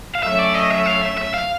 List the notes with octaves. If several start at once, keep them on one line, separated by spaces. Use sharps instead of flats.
F5
F#3 A3 C#4 E5
D5
D#5
E5
F5
E5
E5
F5